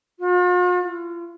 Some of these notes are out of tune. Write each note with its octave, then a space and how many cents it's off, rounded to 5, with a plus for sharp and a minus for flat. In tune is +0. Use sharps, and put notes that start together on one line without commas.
F4 +45
F4 -35